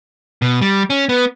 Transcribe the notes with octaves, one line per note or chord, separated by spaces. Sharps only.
B2
G3
C#4
B3